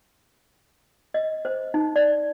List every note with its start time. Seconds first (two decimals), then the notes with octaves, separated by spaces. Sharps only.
1.14 D#5
1.45 C5
1.74 D#4
1.96 D5